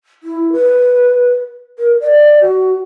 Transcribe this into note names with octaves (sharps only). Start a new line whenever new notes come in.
E4
B4
A#4
D5
F#4